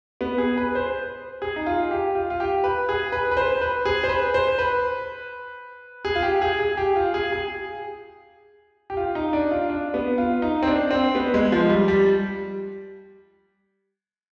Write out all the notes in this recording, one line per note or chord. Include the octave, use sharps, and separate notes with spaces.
B3
G#4
B4
C5
G#4
D#4
F4
G4
F4
F4
G4
B4
G#4
B4
B4
C5
B4
G#4
C5
B4
C5
B4
G#4
F4
G4
G#4
G#4
G4
F4
G#4
G#4
G4
F4
D#4
D4
F4
D4
B3
F4
D#4
C4
D4
C4
B3
G#3
F3
G3
G3